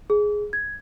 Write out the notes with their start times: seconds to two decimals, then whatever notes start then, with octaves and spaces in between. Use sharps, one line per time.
0.10 G#4
0.53 G#6